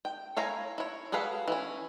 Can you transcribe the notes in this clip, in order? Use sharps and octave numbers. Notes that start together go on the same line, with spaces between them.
G5
E4 C#5 F5 G#5 A#5
E4 C#5
F#4 G#4 A4 B4 F5
E3 C#4